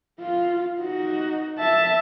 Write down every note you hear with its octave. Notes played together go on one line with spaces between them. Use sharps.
F4
D#4 F#4
E5 A5